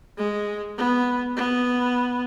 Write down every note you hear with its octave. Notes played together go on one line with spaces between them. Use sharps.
G#3
B3
B3